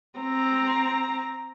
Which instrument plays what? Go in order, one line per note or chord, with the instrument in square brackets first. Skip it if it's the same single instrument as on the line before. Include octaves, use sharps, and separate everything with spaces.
[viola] C4 A#5